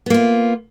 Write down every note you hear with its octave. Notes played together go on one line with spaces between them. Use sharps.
A#3 B3 F4